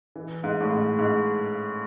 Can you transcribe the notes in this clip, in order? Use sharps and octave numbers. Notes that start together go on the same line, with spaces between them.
E3
G#2
A2
G#2
G#2